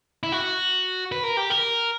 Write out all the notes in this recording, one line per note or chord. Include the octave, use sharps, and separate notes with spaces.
E4
F#4
B4
A#4
G4
A#4